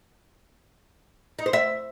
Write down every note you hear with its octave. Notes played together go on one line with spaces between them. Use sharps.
D#4
C5
E5